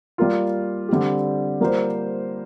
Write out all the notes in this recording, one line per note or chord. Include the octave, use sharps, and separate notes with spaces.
G3 A#3 F4
D3 G3 C4 G4
G3 A#3 F4 C5